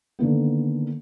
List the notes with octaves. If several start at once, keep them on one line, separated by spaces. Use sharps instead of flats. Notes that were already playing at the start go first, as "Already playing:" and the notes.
D3 D#3 A#3 B3